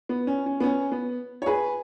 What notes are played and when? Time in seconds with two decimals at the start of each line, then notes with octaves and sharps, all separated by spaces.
0.09 B3
0.27 C#4
0.46 C#4
0.60 B3
0.63 C#4
0.92 B3
1.42 C#5
1.46 G#4 B4